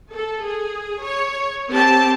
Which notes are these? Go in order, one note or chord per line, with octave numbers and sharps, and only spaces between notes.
A4
G#4
C#5
C4 G4 A5